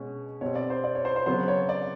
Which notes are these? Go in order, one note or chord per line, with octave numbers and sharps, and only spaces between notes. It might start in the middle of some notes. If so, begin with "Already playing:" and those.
Already playing: B2 G#3 C#4
B2 G3 C4 C#5
D5
C5
D5
C#5
C5
C5
C#3 F#3 B3 C5
C#5
D5